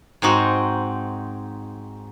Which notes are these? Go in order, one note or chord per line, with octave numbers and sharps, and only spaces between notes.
G#2 C4 D#4 F#4